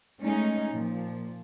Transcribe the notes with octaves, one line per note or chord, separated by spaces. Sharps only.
G#3 A3 C#4 D#4
A#2 F3